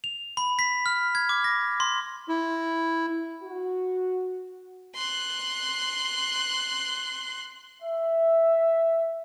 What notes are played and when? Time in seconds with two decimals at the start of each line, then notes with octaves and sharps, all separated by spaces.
0.04 F7
0.37 B5
0.59 B6
0.86 F6
1.15 G#6
1.29 D6
1.44 A#6
1.80 C6
2.28 E4
3.42 F#4
4.95 C6 F#6
7.82 E5